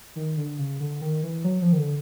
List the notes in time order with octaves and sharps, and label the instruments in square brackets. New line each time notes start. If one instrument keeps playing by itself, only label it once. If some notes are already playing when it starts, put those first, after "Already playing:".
[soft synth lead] D#3
D3
C#3
D3
D#3
E3
F#3
F3
D#3
D3